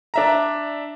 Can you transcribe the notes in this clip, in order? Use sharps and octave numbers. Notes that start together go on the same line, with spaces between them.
D4 E5 A#5